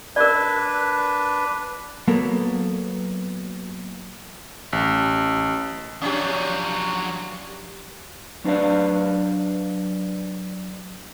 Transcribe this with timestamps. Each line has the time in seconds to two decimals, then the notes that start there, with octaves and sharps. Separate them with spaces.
0.16 D4 A#4 B4 D5
2.08 F#3 A#3 B3 A4 A#4
4.73 A1
6.02 F3 F#3 C#4 D4 G4
8.44 F#3 D4 B4 D5 F5